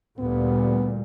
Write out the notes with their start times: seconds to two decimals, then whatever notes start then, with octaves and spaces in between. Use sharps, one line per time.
0.19 D2 A#2 G3 B3